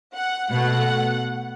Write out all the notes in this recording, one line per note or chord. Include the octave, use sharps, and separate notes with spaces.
F#5
B2 A3 F#5